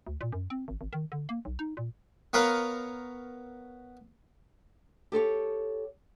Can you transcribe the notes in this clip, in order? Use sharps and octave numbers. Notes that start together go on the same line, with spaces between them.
D2
A#2
F#2
C4
G#1
G#1
D#3
D3
A#3
B1
D#4
A#2
B3 A#4 B4 C#5 F5
G4 A4 C5 C#5